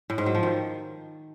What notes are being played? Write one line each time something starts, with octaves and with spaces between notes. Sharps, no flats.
A2
G#2
F#3
F3
D#3